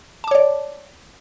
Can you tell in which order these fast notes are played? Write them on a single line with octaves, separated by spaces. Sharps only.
A5 D6 C#5 D5